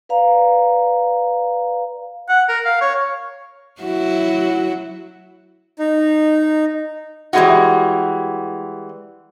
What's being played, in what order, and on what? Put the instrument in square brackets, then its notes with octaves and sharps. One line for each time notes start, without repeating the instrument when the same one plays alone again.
[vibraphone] B4 D5 F5 A#5
[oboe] F#5
A#4
F5
C#5
[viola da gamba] F#3 E4 F#4
[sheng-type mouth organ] D#4
[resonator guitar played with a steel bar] E3 G3 G#3 C4 F4 F#4